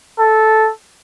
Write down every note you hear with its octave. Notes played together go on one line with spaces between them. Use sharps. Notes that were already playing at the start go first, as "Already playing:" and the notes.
A4